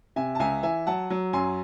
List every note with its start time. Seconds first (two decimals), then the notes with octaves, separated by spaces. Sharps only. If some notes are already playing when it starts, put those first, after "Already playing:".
0.16 C3 E5 G#5
0.35 A5
0.39 C#2 E5 G#5
0.63 E3 E5 G#5
0.87 F#3 F#5 A5
1.10 F#3
1.33 F#2 G#5 C6